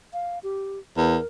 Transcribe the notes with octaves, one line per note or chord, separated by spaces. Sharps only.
F5
G4
E2 A#4